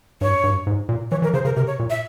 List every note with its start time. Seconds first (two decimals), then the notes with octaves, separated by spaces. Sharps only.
0.21 G2 C#5
0.44 G2
0.67 G#2
0.89 A#2
1.11 E3 C#5
1.22 E3 A#4
1.33 C#3 C5
1.45 C#3 A#4
1.56 C3 A#4
1.67 C#5
1.79 A#2
1.90 E5